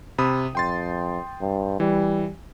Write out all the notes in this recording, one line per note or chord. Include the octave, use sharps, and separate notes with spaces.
C3 B5 D#6
F2 G5 C6 A6
G2
E3 G3